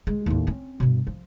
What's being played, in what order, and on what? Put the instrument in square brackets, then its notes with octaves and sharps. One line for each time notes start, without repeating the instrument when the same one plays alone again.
[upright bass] G#3
D#2 A2
C4 C#4
G2 B2
F3